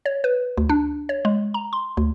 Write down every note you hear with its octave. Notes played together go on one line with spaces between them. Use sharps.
C#5
B4
D2
D4
C#5
G#3
A#5
C6
D2